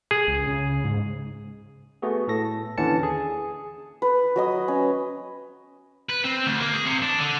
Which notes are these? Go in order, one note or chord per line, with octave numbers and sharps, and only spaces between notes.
G#4
C#2
C#3
G#2
A3 B3 F#4 G#4
A2 A4 A#6
D#2 D3 E3 C#4 A5 C#7
G#4
B4
F#3 D#5 D#6
C#4
B4
C4
D2
A#3
G#4
C3
D4
D3